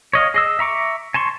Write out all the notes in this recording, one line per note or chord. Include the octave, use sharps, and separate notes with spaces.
C#5 D#5 F5
G#4 D#5 E6
E5 A#5 C#6 D6
G#5 A5 C6 C#6